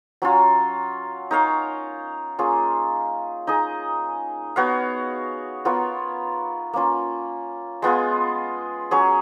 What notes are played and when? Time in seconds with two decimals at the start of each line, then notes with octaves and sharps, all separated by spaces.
0.22 F#3 C#4 F4
1.31 D#4 A#4 C#5 F5
2.39 A#3 C#4 F4 G#4
3.47 D#4 G#4 D#5
4.56 B3 F#4 C#5 F5
5.65 B3 F4 A#4 C#5
6.73 A#3 C#4 F4
7.82 G#3 B3 F4 G#4
8.91 F#3 C#4 G#4 C#5